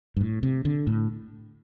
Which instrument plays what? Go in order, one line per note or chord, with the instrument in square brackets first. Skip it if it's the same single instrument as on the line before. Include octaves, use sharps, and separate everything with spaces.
[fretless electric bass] G2
A2
C3
D3
A2